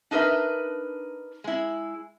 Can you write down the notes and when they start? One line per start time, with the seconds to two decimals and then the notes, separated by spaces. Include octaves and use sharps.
0.11 D4 D#4 A#4 B4 E5
1.44 G#3 E4